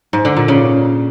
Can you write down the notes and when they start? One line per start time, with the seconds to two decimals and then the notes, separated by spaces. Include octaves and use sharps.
0.13 G#2
0.25 D3
0.37 A#2
0.48 C#3